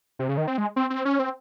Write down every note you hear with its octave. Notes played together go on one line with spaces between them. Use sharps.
C3
C#3
D#3
C4
G#3
C4
C4
C#4
C4